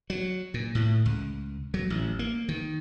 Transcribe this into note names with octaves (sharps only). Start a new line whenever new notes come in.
F#3
A#2
A2
C#2
F#3
A1
A#3
D#3